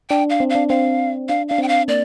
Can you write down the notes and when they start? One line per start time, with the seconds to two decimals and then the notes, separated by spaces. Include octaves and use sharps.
0.10 D4 G5
0.30 F5
0.40 C4
0.50 F5
0.55 D4
0.69 C4 F5
1.29 D4 F5
1.49 D4 F5
1.58 C4 G5
1.68 F5
1.88 A#3 D5